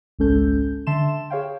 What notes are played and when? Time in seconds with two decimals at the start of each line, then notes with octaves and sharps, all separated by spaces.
0.19 G#1 C#2 G#3 C#4 A4 G6
0.87 D3 E5 A5 C6 E7
1.30 G#4 C#5 F5 G5